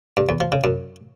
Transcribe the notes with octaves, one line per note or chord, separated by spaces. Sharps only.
G2
E2
F3
C#3
F#2